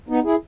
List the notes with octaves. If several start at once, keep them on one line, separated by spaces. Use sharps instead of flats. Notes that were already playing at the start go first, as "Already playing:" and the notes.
B3 D#4
E4 G#4